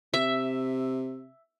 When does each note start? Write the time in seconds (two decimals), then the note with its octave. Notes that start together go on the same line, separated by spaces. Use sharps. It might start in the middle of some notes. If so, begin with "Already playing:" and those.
0.14 C3 E5